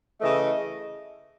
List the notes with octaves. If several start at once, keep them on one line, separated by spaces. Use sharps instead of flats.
C#3 E3 A3 D#5